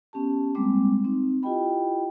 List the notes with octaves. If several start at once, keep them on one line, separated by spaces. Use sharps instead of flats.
B3 C#4 G4 A5
G3 G#3 A#3 C4 D6
C4 D#4
E4 F4 G4 D#5 G5 B5